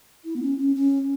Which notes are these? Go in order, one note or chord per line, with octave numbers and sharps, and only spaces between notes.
E4
B3
C#4
C#4
C#4